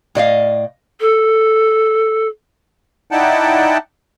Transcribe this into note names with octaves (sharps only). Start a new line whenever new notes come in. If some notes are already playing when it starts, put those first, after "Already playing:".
A2 D5 D#5 F5
A4
D#4 E4 D5 F#5 G5 A5